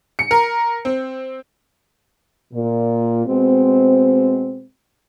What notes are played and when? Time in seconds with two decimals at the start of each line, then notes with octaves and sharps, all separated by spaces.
0.19 C#7
0.31 A#4
0.85 C4
2.54 A#2
3.26 B2 G#3 C4